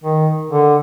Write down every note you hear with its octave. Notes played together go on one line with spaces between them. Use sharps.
D#3
D3